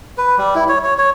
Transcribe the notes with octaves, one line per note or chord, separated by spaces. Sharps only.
B4
G3
E4
C#5
C#5
C#5